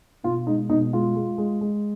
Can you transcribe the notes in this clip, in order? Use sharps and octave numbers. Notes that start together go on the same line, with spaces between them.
B2 F4
G#3 D#4
B2 D#4
G#3 F4
G#3
G#3
G#3